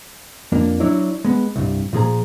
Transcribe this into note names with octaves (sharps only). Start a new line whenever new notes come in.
F2 A#3 D4
F#3 D4 E4 C#5 D5
G#3 B3
C2 G2
A#2 F3 G#4 A#5